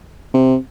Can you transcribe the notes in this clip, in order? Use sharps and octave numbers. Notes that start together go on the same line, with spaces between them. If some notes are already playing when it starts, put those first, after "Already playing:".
C3